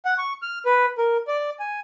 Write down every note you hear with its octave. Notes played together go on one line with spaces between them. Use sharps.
F#5
C#6
F6
B4
A#4
D5
G#5